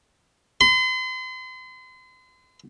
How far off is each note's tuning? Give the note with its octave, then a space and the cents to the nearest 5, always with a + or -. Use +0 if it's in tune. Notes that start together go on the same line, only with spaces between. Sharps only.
C6 -40